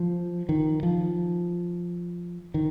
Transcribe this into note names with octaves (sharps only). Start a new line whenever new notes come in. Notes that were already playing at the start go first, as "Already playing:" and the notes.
Already playing: F3
D#3
F3
D#3